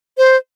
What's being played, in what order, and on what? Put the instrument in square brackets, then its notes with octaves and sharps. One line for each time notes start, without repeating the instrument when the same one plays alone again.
[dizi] C5